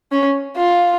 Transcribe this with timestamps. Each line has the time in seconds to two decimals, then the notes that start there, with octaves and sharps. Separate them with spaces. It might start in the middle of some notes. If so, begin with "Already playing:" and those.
0.12 C#4
0.56 F4